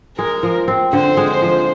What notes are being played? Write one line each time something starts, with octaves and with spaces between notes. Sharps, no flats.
G#3 A#4
F3
C4
D3 C5
G#3
C5
F3